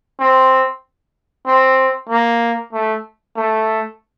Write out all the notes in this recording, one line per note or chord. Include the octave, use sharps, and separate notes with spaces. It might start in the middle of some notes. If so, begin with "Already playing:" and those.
C4
C4
A#3
A3
A3